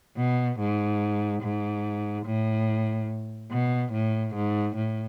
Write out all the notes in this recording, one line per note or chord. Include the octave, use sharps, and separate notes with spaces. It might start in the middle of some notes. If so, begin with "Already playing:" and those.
B2
G#2
G#2
A2
B2
A2
G#2
A2